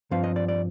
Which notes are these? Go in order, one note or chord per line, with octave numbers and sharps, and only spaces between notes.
G2 F3 C4 F5
D#5
D5
D5